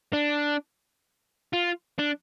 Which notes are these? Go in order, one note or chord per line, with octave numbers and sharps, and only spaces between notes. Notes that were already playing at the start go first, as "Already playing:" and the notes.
D4
F4
D4